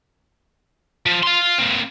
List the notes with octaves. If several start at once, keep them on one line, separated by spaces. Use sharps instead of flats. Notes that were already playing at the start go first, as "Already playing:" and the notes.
F3
F5 C6
A#3 C4